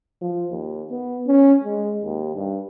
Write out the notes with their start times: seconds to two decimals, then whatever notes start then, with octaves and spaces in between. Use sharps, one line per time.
0.22 F3
0.51 D#2
0.91 B3
1.27 C#4
1.64 G#3
2.04 D#2
2.36 G2